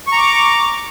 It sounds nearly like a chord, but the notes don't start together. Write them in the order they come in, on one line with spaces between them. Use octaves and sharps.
C#6 A#5 D6